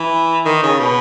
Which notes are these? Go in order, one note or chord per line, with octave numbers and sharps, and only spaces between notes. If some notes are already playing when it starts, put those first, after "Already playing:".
Already playing: E3
D#3
C#3
B2